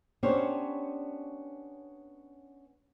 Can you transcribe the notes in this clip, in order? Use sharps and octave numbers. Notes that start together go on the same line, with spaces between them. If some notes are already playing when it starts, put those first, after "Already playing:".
B3 C#4 D4 G4 C5 C#5